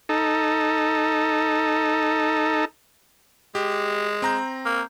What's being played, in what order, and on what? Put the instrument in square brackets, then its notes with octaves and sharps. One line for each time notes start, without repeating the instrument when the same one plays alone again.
[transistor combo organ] D#4 A4
[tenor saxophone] G#3 [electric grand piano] G4
[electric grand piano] C4 A#5 G6
[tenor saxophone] A#3